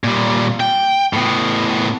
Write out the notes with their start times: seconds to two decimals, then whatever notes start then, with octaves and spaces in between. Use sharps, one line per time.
0.04 A#2 G3
0.60 G5
1.13 A2 B3